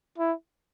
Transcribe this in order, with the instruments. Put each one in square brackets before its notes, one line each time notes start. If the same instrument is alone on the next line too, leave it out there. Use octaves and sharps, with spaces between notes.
[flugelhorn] E4